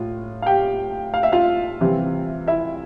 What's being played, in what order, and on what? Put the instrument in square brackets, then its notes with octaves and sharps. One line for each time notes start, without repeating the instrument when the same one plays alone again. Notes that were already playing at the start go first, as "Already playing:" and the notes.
Already playing: [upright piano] A2 F4
F5
G4 G5
F5
E5
F4 F5
C3 E3 G3 C4
E4 E5